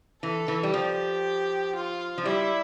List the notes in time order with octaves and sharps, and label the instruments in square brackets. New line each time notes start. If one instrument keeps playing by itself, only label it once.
[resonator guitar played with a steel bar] E3 [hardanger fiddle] A4
[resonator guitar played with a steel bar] E3
G3
[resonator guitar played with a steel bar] F3 [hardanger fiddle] G4
[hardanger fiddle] F4
[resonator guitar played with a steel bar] F3
[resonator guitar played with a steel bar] G3 [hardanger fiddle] E4